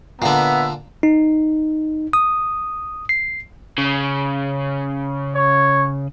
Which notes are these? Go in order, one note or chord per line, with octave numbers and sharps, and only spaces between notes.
A#2 D3 B3 E5 A#5
D#4
D#6
C7
C#3
C#5